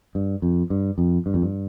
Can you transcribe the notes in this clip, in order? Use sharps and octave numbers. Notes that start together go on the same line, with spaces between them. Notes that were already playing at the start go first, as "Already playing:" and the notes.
G2
F2
G2
F2
G2
F2
G2